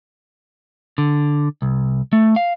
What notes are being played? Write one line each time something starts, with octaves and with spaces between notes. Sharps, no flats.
D3
C2
A3
F5